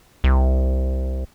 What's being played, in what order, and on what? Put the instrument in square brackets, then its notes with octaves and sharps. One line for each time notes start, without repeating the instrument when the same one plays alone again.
[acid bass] C2